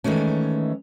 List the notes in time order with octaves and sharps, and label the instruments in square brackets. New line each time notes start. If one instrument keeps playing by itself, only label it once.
[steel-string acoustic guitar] D#3 E3 G#3 A3 C#4